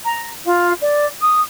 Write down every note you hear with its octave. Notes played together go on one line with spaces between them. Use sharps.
A#5
F4
D5
D#6